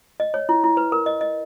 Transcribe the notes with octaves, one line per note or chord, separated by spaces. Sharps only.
D#5
C#5
E4
E4
B4
A#4
D#5
D#5